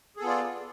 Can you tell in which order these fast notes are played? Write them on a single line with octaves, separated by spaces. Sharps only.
G#4 A4 B3 F4 D5